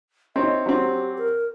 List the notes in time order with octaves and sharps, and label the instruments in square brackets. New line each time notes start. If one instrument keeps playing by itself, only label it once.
[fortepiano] C4 D#4 C#5 [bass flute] E5
[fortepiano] F#3 C4 [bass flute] G4
[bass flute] A#4